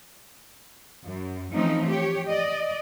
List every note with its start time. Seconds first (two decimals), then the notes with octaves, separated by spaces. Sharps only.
1.05 F#2
1.53 E3 F3 A3 C4 C#4 D#4
1.89 G4 C#5
2.27 D5 D#5